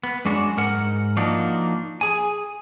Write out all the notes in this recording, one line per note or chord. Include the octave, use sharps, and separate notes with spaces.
B3
F#2 G#3 D4 F#4
G#2 A#4 F#5
F3 A#3 D4 D#4 F#4
G#4 G#5